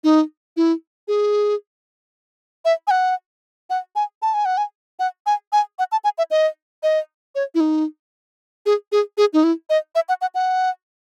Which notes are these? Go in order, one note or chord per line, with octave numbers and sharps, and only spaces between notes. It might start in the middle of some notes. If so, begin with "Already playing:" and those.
D#4
E4
G#4
E5
G#5
F#5
F#5
G#5
A5
G#5
F#5
G#5
F#5
G#5
G#5
F#5
A5
G#5
E5
D#5
D#5
C#5
E4
D#4
G#4
G#4
G#4
D#4
E4
D#5
E5
F#5
F#5
F#5